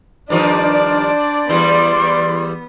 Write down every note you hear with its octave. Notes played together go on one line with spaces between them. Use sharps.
G2 D#3 F3 D4 C5 D5
E2 G3 B3 C6